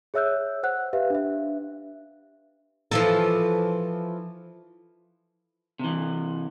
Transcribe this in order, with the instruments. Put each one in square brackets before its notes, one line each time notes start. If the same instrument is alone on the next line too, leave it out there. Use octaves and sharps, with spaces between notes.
[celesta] G#4 C#5 E5 E6 F#6 G6
C5 F#5 F#6
G4 B4 E5 F5
D4 E5
[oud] E3 F3 A4
[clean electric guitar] C3 E3